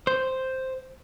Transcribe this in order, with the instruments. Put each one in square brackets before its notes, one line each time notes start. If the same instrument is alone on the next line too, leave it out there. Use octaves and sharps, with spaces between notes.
[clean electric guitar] C5